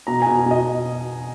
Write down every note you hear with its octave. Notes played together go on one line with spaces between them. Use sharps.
B2 A#5
B2 G#5
B2
D#5